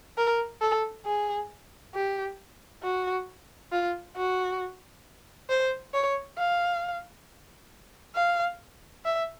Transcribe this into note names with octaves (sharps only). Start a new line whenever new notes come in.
A#4
A4
G#4
G4
F#4
F4
F#4
C5
C#5
F5
F5
E5